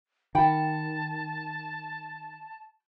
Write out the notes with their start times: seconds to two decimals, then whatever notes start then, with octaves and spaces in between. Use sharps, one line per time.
0.35 D#3 F#5 G5 A5 B5